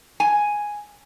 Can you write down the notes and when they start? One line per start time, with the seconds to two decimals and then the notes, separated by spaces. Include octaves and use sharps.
0.20 G#5